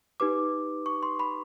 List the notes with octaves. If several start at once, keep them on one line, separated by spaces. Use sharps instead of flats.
D#4 G4 B4 D6
C#6
C6
B5